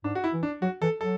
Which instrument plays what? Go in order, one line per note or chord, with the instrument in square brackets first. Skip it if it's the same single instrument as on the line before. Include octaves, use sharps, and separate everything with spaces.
[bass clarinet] G#2 [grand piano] D4
[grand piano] F#4
E4
[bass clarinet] E3
[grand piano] D4
[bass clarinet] F#3 [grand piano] F#4
[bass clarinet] E3 [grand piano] A4
[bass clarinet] F#3 [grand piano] A4